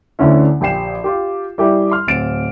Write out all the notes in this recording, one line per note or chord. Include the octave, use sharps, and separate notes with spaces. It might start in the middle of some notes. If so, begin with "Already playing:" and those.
D2 D3 C#4 E4
A#1 G4 G5 G#5 C7 E7
F4 G4
G3 E4 G4 G#4
C6 F6
D1 C4 A6 D7 E7